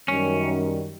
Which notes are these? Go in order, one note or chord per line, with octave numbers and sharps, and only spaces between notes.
F#2 D#3 G3 C#4